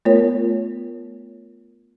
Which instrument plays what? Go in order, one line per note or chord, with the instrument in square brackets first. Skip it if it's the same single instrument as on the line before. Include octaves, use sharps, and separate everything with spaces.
[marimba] A3 B3 F4 A#4 C#5